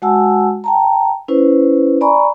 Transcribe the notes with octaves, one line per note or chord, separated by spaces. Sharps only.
G#3 F#4 F#5 G#5 A5 E6
G5 A5 A#5
C#4 E4 B4 C5
D5 G#5 A#5 B5 C#6